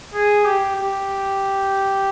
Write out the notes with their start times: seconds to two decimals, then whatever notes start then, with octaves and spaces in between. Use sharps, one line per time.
0.14 G#4
0.45 G4
0.76 G4